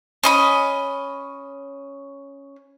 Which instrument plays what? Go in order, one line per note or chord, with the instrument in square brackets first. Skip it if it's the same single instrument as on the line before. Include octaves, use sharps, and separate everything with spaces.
[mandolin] C#4 D#5 B5